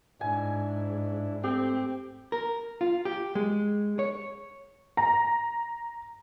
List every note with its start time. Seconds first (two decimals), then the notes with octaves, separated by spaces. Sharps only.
0.21 G#2 D4 E4 G#5
1.43 A3 C4 G4
2.32 A#4
2.81 F4
3.05 G4
3.35 G#3
3.99 C#5
4.97 A#5